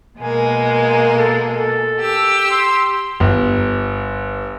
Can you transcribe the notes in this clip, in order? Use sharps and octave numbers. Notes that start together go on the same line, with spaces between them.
B2 G#3 A#3 G#5
A4
A4
G4 E6
C6
G1